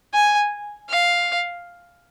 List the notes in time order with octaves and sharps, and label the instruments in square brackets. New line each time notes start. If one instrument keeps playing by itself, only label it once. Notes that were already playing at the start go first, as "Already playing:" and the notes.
[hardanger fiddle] G#5
F5